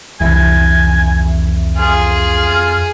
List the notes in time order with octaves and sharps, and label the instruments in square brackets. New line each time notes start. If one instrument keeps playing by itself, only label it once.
[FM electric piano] C2 E3 E5 [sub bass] F2 [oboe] G#5
[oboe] F4 [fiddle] G#4